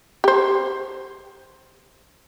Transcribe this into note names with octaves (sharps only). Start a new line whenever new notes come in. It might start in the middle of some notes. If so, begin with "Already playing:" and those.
G4 C5